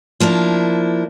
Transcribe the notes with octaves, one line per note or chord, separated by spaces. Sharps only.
F3 A#3 D4 E4